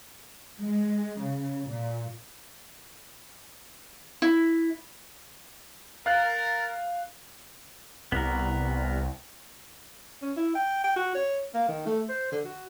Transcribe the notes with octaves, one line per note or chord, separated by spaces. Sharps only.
G#3
C#3
A#2
E4
A#4 F5 F#6 A6
C2 B3 A#4
C#4
E4
G5
G5
F#4
C#5
A#3
D#3
A3
C5
D3
F#4